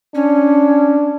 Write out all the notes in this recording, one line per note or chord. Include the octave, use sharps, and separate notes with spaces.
C#4 D4